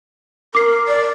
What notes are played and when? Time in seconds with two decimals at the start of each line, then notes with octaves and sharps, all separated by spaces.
0.55 A#4 D6 C7
0.88 D5